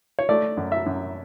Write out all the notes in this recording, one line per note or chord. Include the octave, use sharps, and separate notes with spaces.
C#5
A3 D5
F#2
E5
F#2